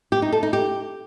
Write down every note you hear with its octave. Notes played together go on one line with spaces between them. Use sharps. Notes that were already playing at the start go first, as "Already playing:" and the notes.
G4
D#4
A4
D#4
G4